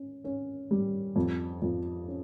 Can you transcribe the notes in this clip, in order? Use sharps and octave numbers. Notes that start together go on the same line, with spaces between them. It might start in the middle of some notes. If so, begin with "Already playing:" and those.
Already playing: C#4
C#4
G3
F2
F2
C#4